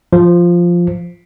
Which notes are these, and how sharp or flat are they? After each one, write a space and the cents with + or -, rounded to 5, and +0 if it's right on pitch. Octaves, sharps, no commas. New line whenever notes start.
F3 +0